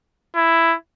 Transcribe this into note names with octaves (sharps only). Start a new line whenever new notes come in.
E4